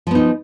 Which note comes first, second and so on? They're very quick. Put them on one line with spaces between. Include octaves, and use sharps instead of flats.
F3 B3 D#4